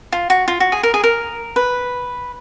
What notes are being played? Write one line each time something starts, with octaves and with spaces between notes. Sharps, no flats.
F4
F#4
F4
F#4
G#4
A#4
G#4
A#4
B4